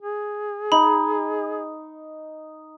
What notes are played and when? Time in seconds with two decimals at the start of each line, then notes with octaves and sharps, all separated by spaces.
0.02 G#4
0.72 D#4 B5